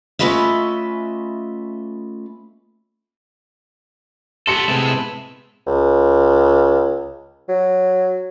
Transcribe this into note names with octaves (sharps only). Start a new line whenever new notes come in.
A3 C#4 F4 B4 D#5 E5
B3 A4 A5 C6 C#7
A2 C3 G#3 B3 E4
C#2
F#3